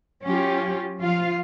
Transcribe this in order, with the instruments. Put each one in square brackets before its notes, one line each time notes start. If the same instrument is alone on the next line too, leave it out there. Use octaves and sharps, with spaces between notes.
[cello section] F#3 C#4 F4 G4
F3 F4 F5